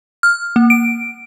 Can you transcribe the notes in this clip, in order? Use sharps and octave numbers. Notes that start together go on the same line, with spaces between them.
F6
A#3
D7